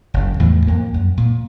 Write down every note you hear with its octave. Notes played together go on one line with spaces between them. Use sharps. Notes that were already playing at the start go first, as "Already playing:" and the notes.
F#1 C#3
E2 A2 E3 F3
F2 A#3
F#2
A#2